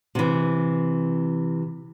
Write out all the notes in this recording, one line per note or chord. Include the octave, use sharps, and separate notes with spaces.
C3 E3